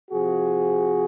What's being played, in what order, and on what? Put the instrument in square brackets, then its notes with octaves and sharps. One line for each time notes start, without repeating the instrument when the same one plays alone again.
[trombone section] C3 F3 F#4 G#4